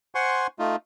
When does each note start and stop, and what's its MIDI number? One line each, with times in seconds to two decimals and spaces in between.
0.15 0.47 72
0.15 0.47 78
0.15 0.47 80
0.15 0.47 84
0.15 0.47 85
0.59 0.76 57
0.59 0.76 63
0.59 0.76 65